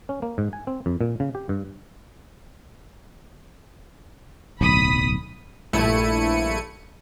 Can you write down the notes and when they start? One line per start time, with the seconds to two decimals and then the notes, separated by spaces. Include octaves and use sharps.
0.09 C#4
0.22 A#3
0.38 G#2
0.53 G#5
0.67 C4
0.86 F2
1.01 A#2
1.20 C#3
1.35 G4
1.49 G2
4.61 D1 B1 B5 D#6 B6
5.73 A#1 G2 A3 E4 C#7 D#7